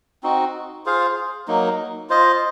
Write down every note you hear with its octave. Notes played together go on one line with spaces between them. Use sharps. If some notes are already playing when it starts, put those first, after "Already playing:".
C4 D#4 F#4
F4 G#4 C5 F5
F#3 A#3 D#4
F4 C5 D#5